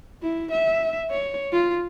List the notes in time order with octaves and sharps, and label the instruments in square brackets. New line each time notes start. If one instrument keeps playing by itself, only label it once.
[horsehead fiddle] E4
E5
C#5
F4